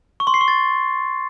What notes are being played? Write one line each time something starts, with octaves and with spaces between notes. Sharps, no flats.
C#6
C6
C7
C#6
A6